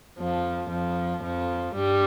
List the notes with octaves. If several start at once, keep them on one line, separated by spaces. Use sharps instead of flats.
F2 F3
F2 F3
F2 F3
G2 G3